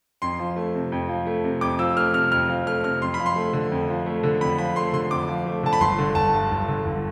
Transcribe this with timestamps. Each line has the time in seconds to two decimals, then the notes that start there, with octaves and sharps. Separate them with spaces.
0.22 F2 C6
0.39 F3
0.56 A3
0.75 C3
0.92 F2
1.09 F3
1.27 A3
1.44 C3
1.61 F2 D6
1.79 F3 E6
1.97 A3 F6
2.14 C3 F6
2.31 F2 F6
2.49 F3
2.66 A3 F6
2.84 C3 F6
3.02 F2 C6
3.14 B5
3.19 F3
3.26 C6
3.36 A3
3.53 D3
3.72 F2
3.89 F3
4.06 A3
4.23 D3
4.41 F2 B5
4.58 F3 B5
4.76 A3 C6
4.93 D3 C6
5.11 F2 D6
5.29 F3
5.46 A3
5.63 D3 A5
5.73 B5
5.80 G1 C6
5.99 D3
6.15 G1 A5
6.33 G2
6.51 G1
6.68 D3
6.86 G1